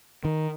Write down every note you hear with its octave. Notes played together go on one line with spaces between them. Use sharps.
D#3